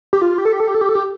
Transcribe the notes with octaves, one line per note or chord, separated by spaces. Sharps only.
G4
F4
G4
A4
G4
A4
G4
A4
G4
A4
G4